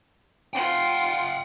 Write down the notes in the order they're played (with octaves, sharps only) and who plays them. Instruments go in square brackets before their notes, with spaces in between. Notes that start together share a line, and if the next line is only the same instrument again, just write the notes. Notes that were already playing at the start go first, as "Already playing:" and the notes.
[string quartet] F4 [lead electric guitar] F#5 G5